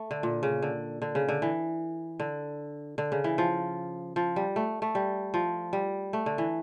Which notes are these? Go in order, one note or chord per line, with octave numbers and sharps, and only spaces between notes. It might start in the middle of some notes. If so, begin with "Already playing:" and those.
Already playing: A3
D3
A#2
C#3
D3
D3
C#3
D3
E3
D3
D3
C#3
E3
F3
F3
G3
A3
A3
G3
F3
G3
A3
D3
E3